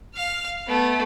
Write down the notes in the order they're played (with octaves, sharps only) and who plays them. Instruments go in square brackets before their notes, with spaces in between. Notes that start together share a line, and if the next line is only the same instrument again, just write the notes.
[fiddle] F5 F6
A3 B3